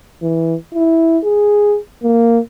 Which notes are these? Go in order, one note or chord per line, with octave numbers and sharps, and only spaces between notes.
E3
E4
G#4
A#3